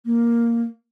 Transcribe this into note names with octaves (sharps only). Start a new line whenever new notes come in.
A#3